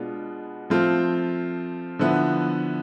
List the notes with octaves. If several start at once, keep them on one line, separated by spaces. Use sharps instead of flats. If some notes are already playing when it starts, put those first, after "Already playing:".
Already playing: B2 G#3 B3 D4 F4
F3 A3 C4 F4
D3 F3 B3 E4